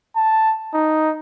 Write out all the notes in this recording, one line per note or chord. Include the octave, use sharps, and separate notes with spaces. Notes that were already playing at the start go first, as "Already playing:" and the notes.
A5
D#4